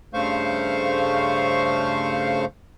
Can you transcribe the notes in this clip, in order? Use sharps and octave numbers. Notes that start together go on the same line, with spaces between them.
G2 C#3 A3 C5 F5 C#6